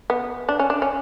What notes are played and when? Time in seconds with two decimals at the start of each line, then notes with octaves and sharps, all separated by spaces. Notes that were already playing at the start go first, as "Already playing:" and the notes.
0.10 B3
0.49 D4
0.59 C#4
0.70 D4
0.82 C#4